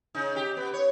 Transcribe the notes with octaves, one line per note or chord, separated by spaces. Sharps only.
C#3 D#4
G4
B3
C#5